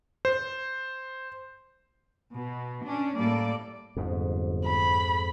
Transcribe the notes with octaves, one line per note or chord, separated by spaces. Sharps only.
C5
B2
C#4 D4
A2 G3 A#3 A4 D5
G1 F2 G#2
B5